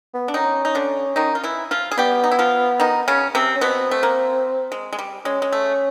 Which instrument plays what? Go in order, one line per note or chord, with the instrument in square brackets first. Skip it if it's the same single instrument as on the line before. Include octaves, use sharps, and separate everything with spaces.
[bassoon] B3
[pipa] D4
[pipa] D#3 D#4 [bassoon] C#4
[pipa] D#4
D3 D4
D#3 D#4
F4
E3 E4
F3 F4
G#4
[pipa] G3 G4 [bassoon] B3
[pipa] D#4
E4
F3 F4
D#3 D#4
C#3 C#4
C3 C4
[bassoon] C#4
[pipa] B2 B3 [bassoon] C4
[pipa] A3
A#3
G#3
G#3
G3
[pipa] G#3 [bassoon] C#4
[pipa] G#3
A3